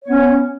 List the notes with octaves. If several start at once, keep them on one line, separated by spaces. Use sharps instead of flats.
B3 C#4 C#5